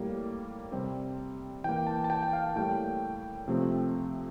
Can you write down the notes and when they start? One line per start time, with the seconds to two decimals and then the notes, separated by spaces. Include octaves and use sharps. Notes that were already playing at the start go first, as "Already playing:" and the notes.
Already playing: A2 G3 A#3
0.72 C3 G3 C4
1.64 E3 A#3 G5
1.87 A5
2.04 A5
2.10 G5
2.23 G5
2.33 F5
2.56 A2 G3 A#3 G5
3.48 C3 F3 A3 C4